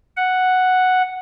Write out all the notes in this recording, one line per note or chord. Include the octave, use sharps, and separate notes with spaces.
F#5